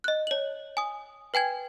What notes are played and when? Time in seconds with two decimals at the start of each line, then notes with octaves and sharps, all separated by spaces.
0.04 D#5 F#6
0.27 C#5 F#7
0.77 G#5 D#6
1.34 B4 G5 G#5 G#6